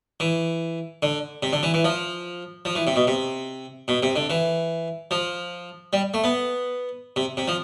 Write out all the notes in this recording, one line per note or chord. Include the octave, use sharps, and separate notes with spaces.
E3
D3
C3
D3
E3
E3
F3
F3
E3
C3
B2
C3
B2
C3
D3
E3
F3
G3
A3
B3
C3
C3
F3